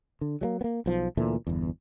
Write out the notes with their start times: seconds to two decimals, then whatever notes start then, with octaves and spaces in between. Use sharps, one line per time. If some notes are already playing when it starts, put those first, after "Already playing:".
0.21 D3
0.41 F#3 G#3 A#3
0.61 A#3 B3
0.86 B1 F3
1.17 D2 A#2 E3 A3
1.47 G1 E2